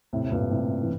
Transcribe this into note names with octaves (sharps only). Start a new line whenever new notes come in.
A2 C3
A2
G2 A#2
A2 C3
E3